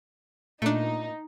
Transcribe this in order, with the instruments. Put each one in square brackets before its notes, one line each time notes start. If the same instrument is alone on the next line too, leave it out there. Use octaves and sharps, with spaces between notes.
[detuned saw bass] A#2 [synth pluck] A3 D4 [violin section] D#4